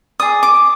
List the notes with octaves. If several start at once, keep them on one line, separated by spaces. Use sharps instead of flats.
G#4 D5 D#6
D6